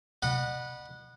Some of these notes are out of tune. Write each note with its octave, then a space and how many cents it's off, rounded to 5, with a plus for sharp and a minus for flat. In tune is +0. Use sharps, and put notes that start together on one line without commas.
D#5 -45 F#5 -10 B5 -15